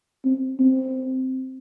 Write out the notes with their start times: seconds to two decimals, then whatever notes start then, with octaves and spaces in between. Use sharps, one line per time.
0.25 C4
0.60 C4